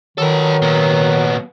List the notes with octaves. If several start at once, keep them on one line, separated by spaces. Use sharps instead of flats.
D#3 F#3 A4 B4
A#2 B3